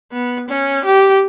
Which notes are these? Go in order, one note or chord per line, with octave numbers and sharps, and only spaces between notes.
B3
C#4
G4